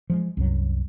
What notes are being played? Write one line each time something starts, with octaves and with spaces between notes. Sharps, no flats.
F3 G3 G#3
C2 F#2 F#3